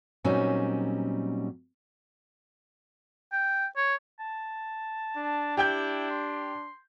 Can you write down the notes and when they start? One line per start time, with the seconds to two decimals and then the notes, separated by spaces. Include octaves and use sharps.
0.24 A#2 F#3 G3 C4 C#4 D#4
3.32 G5
3.77 C#5
4.19 A5
5.17 D4
5.57 E4 G4 G5 G6
6.10 C6